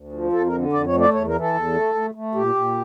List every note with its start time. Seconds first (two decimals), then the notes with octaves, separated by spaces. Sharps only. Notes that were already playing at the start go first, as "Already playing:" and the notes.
Already playing: D2
0.12 F3
0.32 F2 A4
0.47 A#4
0.52 D3
0.73 F2 D5
0.87 C#5
0.93 A3
1.00 D5
1.13 E2 C#5
1.27 A#4
1.34 E3
1.40 A4
1.54 E2
1.74 A3
1.95 A3
2.15 A3
2.35 A#2 G4
2.55 A#2